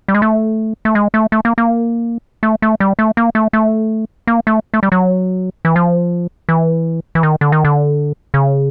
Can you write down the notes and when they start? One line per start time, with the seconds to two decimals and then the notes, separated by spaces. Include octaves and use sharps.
0.08 G3
0.15 G#3
0.22 A3
0.85 A3
0.95 G#3
1.14 A3
1.32 A3
1.45 A#3
1.58 A#3
2.43 A3
2.62 A3
2.80 G3
2.99 A3
3.17 A#3
3.35 A3
3.53 A3
4.27 A#3
4.47 A3
4.74 A3
4.83 G3
4.92 F#3
5.65 E3
5.76 F3
6.49 E3
7.15 E3
7.23 D#3
7.41 D3
7.52 D#3
7.65 D3
8.34 C#3